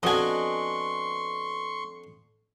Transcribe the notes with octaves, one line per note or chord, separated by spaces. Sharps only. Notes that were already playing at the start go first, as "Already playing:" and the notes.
F2 B3 D4 F#4 D#5 G#5 C6 C#6